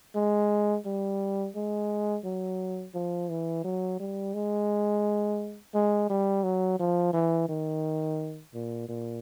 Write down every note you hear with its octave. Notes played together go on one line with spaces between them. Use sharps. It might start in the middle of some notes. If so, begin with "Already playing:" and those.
G#3
G3
G#3
F#3
F3
E3
F#3
G3
G#3
G#3
G3
F#3
F3
E3
D#3
A#2
A#2